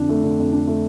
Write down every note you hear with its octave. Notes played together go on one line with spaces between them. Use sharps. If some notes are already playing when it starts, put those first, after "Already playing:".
Already playing: F2 D3 D4
A3
D3
F2
D4
A3